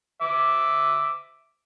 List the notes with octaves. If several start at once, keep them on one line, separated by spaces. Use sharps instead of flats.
E5 D6